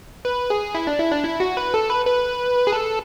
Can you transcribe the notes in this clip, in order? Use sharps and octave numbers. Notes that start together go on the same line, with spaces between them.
B4
G#4
E4
D4
E4
D4
E4
F#4
B4
A4
B4
B4
G#4
A4